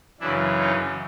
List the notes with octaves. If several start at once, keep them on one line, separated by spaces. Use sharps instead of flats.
F#2 C#3 E3 D4 E4
C#4 D#4